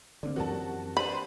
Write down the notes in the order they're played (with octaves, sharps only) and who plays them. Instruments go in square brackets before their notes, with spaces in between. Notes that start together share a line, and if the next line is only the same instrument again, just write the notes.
[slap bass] D3 D#3 A#3 [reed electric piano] C4 D4 D5
[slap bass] F#2 E3 F3 [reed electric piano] C4 G4 A#4 [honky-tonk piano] F#4 A5
[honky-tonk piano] D4 B4 C5 [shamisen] B5